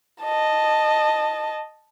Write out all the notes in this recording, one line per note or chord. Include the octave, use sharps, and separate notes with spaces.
D#5 A5